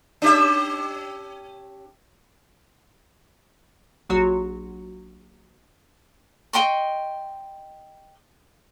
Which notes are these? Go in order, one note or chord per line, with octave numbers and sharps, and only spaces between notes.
C#4 G4 E5
A#1 F#3 F#4 C#5 C6
D#5 G5 C6 C#6